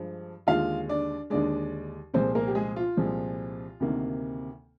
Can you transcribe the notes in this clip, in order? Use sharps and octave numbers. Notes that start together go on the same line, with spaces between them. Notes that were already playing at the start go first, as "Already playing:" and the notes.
Already playing: G2 F3 G#3
D#2 D3 G#3 F4 F5
D4 D5
D#2 D3 G#3 D4 D5
C2 A#2 F3 G#3 C4 C5
A#3 A#4
G4
G#3 G#4
F4
C2 A#2 F3 G#3
D2 C3 D#3 A#3